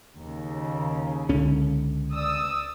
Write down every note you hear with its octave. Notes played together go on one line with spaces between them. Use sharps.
D#2 C#3
C#2 D3 C#4
D5 D#6 E6